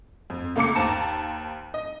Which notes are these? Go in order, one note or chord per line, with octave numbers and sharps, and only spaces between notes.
F2
C#2 A3 A#3 A4 D6 C#7
D#2 C5 A5 A#5
D#5